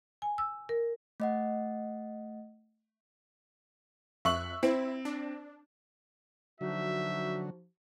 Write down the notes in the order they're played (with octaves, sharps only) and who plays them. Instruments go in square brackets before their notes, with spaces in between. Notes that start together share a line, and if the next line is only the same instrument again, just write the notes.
[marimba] G#5
E6
A#4
[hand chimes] A3 D#5 F#5
[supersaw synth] F2 F#6 [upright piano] E5 C#6 F#7
[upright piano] C4 [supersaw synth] E4
[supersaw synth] D4
[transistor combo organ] D3 F#3 [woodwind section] F3 D#4 F#4 [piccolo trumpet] E5